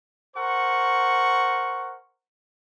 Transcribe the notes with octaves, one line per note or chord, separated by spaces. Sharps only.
A#4 C5 F#5 C#6